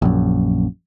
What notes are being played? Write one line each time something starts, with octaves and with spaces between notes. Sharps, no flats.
A#1 F#2